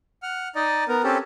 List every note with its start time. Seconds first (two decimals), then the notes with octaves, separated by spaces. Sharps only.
0.23 F#5 F6
0.55 D#4 D5 D#5
0.88 B3 A#4
1.04 C4 C#4 G4 A4